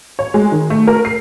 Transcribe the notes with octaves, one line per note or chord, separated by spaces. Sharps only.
C#5
G#3
D#3
A3
A#4
C7